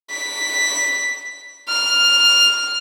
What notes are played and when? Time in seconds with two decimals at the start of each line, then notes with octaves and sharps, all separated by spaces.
0.11 B6
1.69 F6